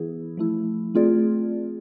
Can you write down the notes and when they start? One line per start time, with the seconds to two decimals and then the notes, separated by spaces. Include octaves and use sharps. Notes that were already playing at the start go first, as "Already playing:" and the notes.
Already playing: E3 B3 E4 G#4
0.37 F3 A3 E4
0.95 A3 C4 F4 G#4 D5